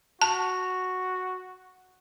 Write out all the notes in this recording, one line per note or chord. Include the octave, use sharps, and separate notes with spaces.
F#4 A5